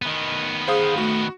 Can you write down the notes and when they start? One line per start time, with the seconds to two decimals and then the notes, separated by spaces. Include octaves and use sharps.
0.02 D#3 B3
0.68 G#4 C5 F5 D#6
0.98 A3 F#4